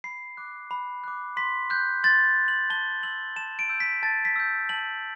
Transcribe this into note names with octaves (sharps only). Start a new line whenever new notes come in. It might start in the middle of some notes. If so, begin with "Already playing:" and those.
B5 C7
D6 F#6
B5
D6 F#6
C6 B6
F#6 G6
C6 A6
F#6
F#7
A5 G7
E6 G6 F#7
A5 E7
D7
E6 G6
B6
A5 A6
B6
E6 G6
A5 F#7